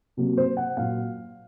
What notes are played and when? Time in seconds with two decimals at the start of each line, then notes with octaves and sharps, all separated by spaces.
0.17 C3 F#3 A#3
0.37 C5
0.57 F#5
0.77 A#2 F#3 A#3 F5